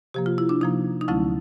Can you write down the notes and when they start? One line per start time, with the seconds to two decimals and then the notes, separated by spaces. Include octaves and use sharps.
0.14 C3 F3 A#3 G4
0.26 F4
0.38 E4
0.49 D4
0.61 C3 F3 A#3 D#4
1.01 D#4
1.08 D2 D3 F#3 A3 C#4 E4